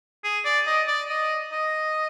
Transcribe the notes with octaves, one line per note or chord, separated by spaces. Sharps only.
G#4
D5
D#5
D5
D#5
D#5